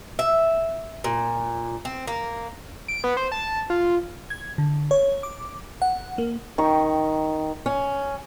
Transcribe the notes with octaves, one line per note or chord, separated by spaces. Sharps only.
E5
A#2
C4
A#3
D7
B3
C5
A5
F4
G#6
D3
C#5
D6
F#5
A#3
D#3 G5 C#6
C#4